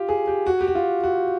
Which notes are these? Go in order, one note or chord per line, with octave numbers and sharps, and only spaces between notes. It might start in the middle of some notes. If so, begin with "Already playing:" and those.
Already playing: F4 G4
G#4
G4
F#4
G4
F#4
F4
F#4